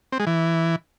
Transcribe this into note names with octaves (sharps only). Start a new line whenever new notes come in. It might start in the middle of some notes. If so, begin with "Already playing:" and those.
C4
G#3
E3